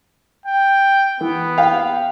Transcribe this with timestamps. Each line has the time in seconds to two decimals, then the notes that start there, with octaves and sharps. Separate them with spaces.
0.46 G5
1.21 E3 B3
1.58 F5 G5